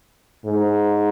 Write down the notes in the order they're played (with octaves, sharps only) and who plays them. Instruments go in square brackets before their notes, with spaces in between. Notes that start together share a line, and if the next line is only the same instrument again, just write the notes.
[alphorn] G#2